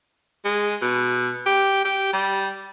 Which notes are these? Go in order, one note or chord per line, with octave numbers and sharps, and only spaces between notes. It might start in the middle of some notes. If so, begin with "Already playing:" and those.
G#3
B2
G4
G4
G3